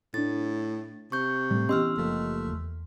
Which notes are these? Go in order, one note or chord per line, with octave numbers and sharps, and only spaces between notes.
A2 A3 D4 A6
C3 C#6 G6
A2 G3 A3
E3 B3 C#4 G4 D#5 C6 E6 F6
F#1 F3 A3 A#3
E2